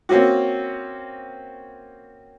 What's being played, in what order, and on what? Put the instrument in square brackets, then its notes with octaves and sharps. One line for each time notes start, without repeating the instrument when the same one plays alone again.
[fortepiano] A#3 C4 C#4 F#4